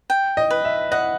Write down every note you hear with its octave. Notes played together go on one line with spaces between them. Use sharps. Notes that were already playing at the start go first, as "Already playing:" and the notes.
G5
D#5
B4
E5
D#5 F#5